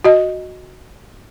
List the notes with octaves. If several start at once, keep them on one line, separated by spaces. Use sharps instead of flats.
F#4 D#5